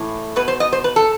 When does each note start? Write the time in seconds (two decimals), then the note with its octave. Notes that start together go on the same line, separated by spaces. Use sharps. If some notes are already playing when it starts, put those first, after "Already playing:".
Already playing: A2 E3
0.36 B2 B4
0.48 C5
0.60 D#5
0.73 C5
0.84 B4
0.96 A4